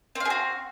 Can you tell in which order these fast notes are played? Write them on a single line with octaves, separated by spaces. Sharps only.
C4 F5 G#4 F#4